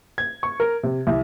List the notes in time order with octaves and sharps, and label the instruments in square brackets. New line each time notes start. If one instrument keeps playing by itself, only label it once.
[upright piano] G#6
C#6
A#4
C3
C2